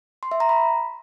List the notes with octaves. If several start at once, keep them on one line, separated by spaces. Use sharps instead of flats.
C6
E5
A#5
B5